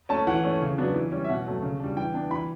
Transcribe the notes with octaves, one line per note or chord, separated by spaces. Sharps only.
A3 C#4 A5
E3 F#5
A3 C#4
C#3
F#3 B3 D4
E3
G3 C#4
E5
B2 F#5
F#3 A3
C#3
G3 D4
E3 G5
B3 D4
E3 B5